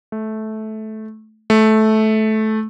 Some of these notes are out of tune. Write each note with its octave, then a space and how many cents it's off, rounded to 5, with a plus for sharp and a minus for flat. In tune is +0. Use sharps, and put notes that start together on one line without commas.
A3 -15
A3 -15